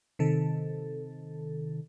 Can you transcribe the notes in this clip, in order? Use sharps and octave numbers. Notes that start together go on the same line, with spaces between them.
C3 D#3 A4